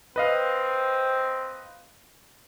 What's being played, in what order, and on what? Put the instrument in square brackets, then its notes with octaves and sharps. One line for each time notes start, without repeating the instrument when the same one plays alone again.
[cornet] C4 [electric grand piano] B4 D#5 F5